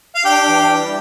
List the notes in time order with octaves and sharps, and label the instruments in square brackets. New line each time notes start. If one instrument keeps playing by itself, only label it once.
[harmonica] F5
[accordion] D4 [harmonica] G4 G5
[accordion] E3
G3